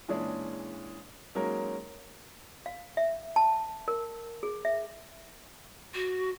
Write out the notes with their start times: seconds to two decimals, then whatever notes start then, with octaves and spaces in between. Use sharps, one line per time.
0.08 A#2 E3 G#3 C#4 D4 G#4
1.35 F#3 G#3 A#3 C#4 D#4 A#4
2.66 F5
2.97 E5
3.36 A5
3.88 A#4
4.43 G#4
4.65 E5
5.94 F#4